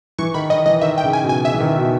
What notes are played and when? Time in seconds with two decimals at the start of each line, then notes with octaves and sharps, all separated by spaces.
0.18 E3 C#6
0.34 D#3 B5
0.50 D#3 D#5
0.66 E3 D#5
0.81 D#3 E5
0.98 G5
1.03 C#3
1.13 G#5
1.24 B2
1.29 G#5
1.45 C#3 E5
1.54 E3
1.60 D#3
1.77 B2